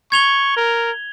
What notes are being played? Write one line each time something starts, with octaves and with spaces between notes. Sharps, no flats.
C#6 G#6 F7 G7
A#4